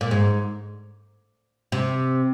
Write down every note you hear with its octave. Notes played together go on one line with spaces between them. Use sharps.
A#2
G#2
C3